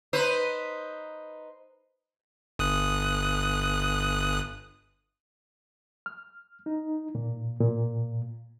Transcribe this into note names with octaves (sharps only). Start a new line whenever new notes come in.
D#4 B4 C5
G1 D#6 F#6
F6
D#4
A#2
A#2